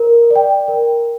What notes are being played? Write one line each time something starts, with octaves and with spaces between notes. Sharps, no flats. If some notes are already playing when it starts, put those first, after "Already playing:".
Already playing: A#4
D5 G5
A#4